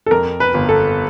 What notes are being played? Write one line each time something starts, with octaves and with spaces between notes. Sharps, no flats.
A4
F2 A#4
B4
G1
A4